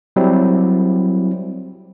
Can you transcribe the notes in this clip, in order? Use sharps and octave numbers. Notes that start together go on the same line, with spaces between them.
F#3 G3 C4 E4